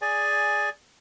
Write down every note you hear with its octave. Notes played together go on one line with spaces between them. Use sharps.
G#4 D5 G#5